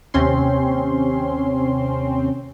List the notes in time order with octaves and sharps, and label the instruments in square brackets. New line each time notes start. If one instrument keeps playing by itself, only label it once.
[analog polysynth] D#2 C3 C4 C#4 C6